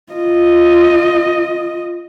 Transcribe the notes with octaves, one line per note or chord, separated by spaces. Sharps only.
F4 D#5